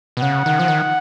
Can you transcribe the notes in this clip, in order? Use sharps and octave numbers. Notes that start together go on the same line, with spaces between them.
B2
C#3 F#5
D#3
F3
D#3